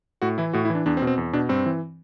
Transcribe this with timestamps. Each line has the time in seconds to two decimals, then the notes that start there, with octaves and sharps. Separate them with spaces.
0.22 A2 F#4
0.38 E3 E4
0.53 A2 F#4
0.65 E4
0.70 E3 D4
0.86 E2 D4
0.97 C4
1.02 B2
1.07 C4
1.18 E2
1.33 B2 D4
1.49 G2 C4
1.66 E3